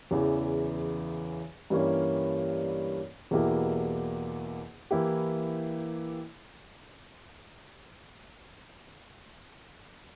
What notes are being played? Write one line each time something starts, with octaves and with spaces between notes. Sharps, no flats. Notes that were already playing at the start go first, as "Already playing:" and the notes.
E2 C#3 E3
G2 E3 G3 A#3 C#4
E2 B2 A#3 E4 G4
E3 A#3 E4 G4